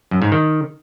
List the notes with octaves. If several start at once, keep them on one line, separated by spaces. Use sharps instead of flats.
F#2
G#2
D#3